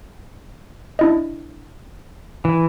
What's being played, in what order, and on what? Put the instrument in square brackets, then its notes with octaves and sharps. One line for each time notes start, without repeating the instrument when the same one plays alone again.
[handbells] D4 E4 D#5
[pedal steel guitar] E3